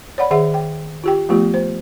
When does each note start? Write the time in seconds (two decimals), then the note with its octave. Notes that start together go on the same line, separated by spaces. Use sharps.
0.18 C#5 D5 F#5 B5
0.31 D#3 G#4 E5 F#5
0.54 G5
1.04 F4 G4 G5
1.29 F3 A3 B3 F4 G4
1.54 C5